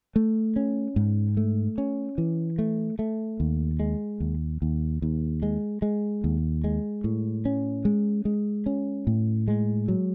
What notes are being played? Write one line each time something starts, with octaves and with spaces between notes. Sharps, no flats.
A3
C#4
G#2
A3
C#4
E3
A3
A3
D#2
G#3
D#2
D#2
D#2
G#3
G#3
D#2
G#3
A2
C#4
G#3
G#3
C#4
A2
G#3
F#3